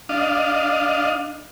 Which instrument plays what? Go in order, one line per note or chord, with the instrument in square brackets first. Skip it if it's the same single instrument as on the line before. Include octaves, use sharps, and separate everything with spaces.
[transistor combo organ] D4 D#5 F5